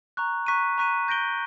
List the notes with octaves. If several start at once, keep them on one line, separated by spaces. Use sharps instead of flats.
A#5 C#6 F#6
A#5 C#6 F#6 B6 D#7
A#5 C#6 F#6 B6 D#7
G6 A#6 D7 G7